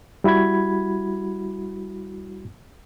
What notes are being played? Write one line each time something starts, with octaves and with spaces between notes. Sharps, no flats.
G3 E4 F#4 B5 G#6